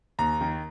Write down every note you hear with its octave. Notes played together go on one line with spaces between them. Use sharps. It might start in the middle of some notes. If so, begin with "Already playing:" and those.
D#2 A#5
D#3